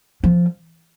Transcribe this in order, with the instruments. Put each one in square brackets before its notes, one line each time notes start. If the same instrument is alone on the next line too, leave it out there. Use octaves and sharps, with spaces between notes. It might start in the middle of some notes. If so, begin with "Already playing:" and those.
[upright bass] F3